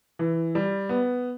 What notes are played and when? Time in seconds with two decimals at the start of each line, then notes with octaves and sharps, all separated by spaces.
0.19 E3
0.55 G3
0.89 B3